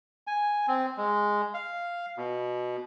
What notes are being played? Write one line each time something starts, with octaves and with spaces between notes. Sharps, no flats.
G#5
C4
G#3
F5
B2